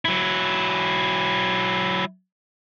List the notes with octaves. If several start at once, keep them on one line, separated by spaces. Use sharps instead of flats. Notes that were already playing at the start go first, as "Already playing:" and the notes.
F#3 E4